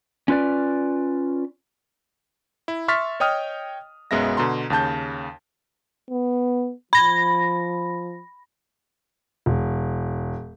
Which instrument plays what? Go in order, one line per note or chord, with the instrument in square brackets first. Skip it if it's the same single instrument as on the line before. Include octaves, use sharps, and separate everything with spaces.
[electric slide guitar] C#4 F4 B4 D5
[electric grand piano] E4
E5 C6 C#6 F6 A6 B6
C#5 D#5 G5 D#6 F6
B1 F#2 G#3 B3 E5 A#6
B2 D3 A#5 C6
D#2 C#3 A5 G6
[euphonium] B3
[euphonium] F3 [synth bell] B5 A#6
[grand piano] E1